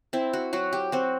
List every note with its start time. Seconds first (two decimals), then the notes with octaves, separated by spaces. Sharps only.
0.13 C4 E4
0.33 F#4
0.53 F#3 F#4
0.73 G4
0.92 C4 F#4